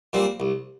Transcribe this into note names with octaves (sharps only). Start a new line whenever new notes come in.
A#2 G3 C4
C2